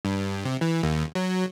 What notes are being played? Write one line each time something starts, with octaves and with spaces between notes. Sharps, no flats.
G2
C3
E3
D#2
F#3